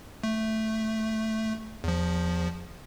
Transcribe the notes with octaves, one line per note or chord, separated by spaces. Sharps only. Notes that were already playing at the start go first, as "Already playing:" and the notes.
A3
E2 F3